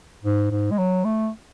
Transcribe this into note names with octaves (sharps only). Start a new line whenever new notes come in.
G#2
G#2
G#3
F#3
A3